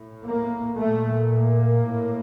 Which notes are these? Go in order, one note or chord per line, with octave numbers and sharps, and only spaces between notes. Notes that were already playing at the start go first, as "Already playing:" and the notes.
Already playing: A2
A#3
A#2 A3
A#3
A2